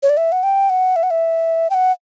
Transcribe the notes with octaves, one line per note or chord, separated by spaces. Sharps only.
C#5
D5
E5
F#5
G5
F#5
E5
F#5
E5
G5
F#5